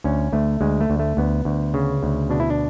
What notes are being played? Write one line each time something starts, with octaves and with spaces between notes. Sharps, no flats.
D2 C#4
D2 A3
D2 G#3
A3
D2
A3
D2 B3
D2
C#3
D2
B2 D4
E4
D4